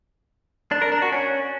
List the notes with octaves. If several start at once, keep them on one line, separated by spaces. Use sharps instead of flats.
D4
A#4
D4
F#4
C#4